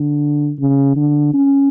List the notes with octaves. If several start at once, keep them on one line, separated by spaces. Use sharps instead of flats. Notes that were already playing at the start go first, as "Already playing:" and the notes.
Already playing: D3
C#3
D3
C#4